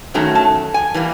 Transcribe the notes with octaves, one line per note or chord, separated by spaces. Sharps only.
G2 D#3 F#3 A3 C#4 A#5
A5
G#5
E3 G3 A#3